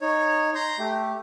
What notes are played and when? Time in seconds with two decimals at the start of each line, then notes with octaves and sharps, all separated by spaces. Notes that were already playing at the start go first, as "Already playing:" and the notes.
0.01 D#4 C#5
0.55 A#5 C6 G6
0.79 A3 G4